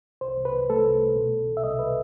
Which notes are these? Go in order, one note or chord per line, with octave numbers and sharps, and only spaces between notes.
C2 C5
C2
B4
C2
A3 A4
C2
C2
B2
C2
C2
E5
C2 D#5
B4